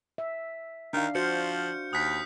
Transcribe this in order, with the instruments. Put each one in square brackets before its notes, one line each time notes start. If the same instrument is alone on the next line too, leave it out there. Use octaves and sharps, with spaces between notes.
[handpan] E5
[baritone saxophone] D#3 [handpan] D4 F5
[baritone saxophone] F3 [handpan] F#4 C5 [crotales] F6 G6 C#7
[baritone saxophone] D#2 [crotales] D#6 F#6 B6